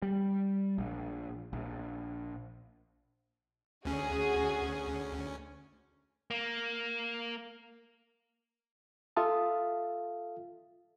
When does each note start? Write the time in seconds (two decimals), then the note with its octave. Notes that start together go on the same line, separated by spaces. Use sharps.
0.02 G3
0.78 A#1
1.53 A#1
3.85 D2 C#4 F#4 G#4
6.31 A#3
9.17 F4 A4 E5 F5 A5 D#6